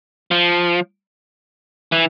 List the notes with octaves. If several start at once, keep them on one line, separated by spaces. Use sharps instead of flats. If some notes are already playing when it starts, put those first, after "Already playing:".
F3
E3